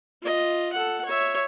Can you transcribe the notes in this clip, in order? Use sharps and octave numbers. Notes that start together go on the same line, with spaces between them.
F4 D#5
A4 F#5
C#5 E5